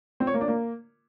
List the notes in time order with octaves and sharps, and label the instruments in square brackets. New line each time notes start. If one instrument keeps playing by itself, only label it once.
[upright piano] C4
C#5
A#3
D4
A#3